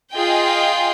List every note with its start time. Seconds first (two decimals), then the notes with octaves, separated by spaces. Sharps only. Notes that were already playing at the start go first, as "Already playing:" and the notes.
0.12 F4 G#4 D#5 G5